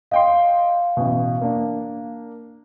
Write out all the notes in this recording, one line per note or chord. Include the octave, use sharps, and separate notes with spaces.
D#5 F5 G5 C6
A1 B2
A#3 D4